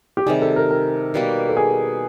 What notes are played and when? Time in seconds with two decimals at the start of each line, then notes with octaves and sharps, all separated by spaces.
0.17 G4
0.27 C3 D#3 G3 G#4
0.42 A4
0.56 A#4
0.70 A#4
1.14 B2 G3 A#3
1.49 A4
1.57 G#4